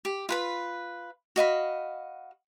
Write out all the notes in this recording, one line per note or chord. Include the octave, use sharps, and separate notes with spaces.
G4
F4 B4 B5
F#4 D#5 F5 B5